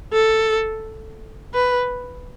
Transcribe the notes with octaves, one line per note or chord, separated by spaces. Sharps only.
A4
B4